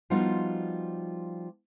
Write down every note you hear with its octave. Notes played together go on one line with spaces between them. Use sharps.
F3 G3 B3 D#4 F4 F#4